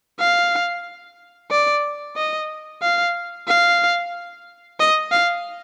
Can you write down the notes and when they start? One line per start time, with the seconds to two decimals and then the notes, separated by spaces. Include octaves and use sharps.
0.20 F5
1.51 D5
2.16 D#5
2.82 F5
3.48 F5
4.80 D#5
5.12 F5